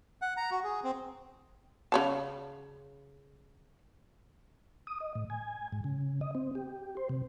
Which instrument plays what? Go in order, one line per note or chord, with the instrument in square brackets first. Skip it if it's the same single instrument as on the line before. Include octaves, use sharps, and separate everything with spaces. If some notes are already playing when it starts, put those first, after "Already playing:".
[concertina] F#5
A#5
F#4
G#4
C4
[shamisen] C#3 C#5 A5
[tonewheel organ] D#6
D#5
A2
G#5
G#2
C#3
D#5
C4
G4
C5
C3